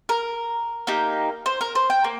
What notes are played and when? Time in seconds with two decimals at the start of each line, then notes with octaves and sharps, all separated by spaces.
0.09 A#4
0.87 A#3 D#4 G4
1.46 C5
1.61 A#4
1.75 C5
1.90 G5
2.04 A#3